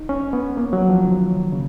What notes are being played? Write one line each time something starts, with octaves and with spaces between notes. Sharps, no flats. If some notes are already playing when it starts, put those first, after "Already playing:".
Already playing: D#4
C#4
B3
A#3
F#3
F3
D#3
C#3